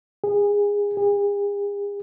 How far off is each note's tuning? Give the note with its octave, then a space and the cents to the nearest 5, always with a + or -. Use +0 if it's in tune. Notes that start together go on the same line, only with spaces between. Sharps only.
G#4 -20
G#4 -40